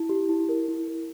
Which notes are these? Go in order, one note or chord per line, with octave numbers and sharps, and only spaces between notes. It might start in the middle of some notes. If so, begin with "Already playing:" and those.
Already playing: E4
G4
E4
A#4
E4
A#4